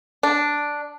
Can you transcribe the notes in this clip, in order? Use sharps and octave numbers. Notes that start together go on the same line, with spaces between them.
D4